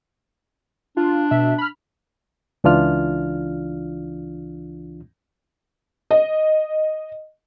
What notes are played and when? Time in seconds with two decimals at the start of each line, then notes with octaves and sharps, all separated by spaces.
0.97 D4 F4
1.31 B2 E5
1.58 B5 F6
2.64 C#2 E3 D4 F4 F6
6.11 D#5